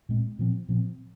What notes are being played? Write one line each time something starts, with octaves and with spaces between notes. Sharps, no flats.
A#2 G#3 C4
A#2 F3 C4
A#2 F3 C4